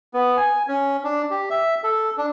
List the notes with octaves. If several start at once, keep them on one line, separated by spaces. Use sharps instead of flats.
B3
G#5
C#4
D4
G4
E5
A4
D4